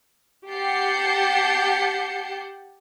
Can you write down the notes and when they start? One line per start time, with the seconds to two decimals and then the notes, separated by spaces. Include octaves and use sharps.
0.50 G4 F#5 A5 G6 C7 C#7